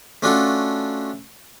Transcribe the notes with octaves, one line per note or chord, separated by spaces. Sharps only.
A3 C#4 D4 F4 F#4 A4